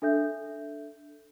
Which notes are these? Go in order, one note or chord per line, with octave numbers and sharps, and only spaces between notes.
D4 A4 E5 G6